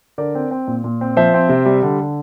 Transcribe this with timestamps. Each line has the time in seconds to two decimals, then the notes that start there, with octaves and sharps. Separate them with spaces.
0.18 D3 A#4 D5
0.35 C4
0.51 C4
0.67 A#2
0.84 A#2
1.01 C4
1.17 F3 C5 E5
1.34 C4
1.49 C3
1.66 G3
1.83 D3
2.00 D3